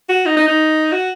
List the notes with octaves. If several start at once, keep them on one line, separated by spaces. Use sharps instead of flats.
F#4
D#4
D#4
D#4
F#4